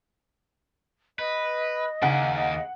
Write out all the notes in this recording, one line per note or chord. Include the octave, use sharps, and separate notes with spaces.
B4 D#5
D#2 C#3 A#4 F#5
D#5